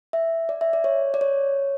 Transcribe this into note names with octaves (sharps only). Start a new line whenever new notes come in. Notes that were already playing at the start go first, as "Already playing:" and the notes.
E5
D5
E5
D5
C#5
D5
C#5